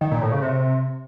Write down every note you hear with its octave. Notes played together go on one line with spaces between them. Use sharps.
D#3
A#2
A2
C#3
C3